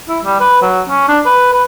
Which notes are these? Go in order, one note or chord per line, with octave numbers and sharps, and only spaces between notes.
E4
G3
B4
F#3
C#4
D4
B4
B4